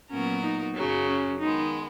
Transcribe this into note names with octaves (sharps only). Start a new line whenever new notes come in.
A#2 F#3 B3 C#4 F#4 A#4
D#4
F#2 C#3 F#3
C#4
D#3 G#3 B3 D#4